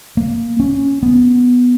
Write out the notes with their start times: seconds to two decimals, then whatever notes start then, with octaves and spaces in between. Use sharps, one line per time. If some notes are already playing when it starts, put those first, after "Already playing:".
0.17 A#3
0.60 C#4
1.03 B3